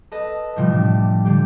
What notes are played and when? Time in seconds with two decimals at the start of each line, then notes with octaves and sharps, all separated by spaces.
0.12 A4 B4 D#5
0.56 A2 C3 E3 F3 G3 A3
0.72 D4
1.25 D3 G3 G4